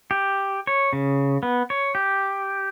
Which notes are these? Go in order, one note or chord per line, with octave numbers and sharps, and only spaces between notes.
G4
C#5
C#3
B3
C#5
G4